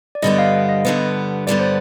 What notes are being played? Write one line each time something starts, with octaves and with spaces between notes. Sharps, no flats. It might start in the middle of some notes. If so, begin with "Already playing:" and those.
D5
G2 D3 G3 B3 D#5
F5
F5
D#5
G2 D3 G3 B3
G2 D3 G3 B3 D5
C5